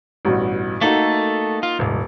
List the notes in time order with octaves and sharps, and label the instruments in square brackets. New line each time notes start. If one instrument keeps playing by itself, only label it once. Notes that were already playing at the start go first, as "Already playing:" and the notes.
[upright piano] A1 G2 B2
[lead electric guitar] A3 A4 [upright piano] A#3 D#4 F#4
[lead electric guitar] F4
[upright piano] D#1 [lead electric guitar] C2 G#2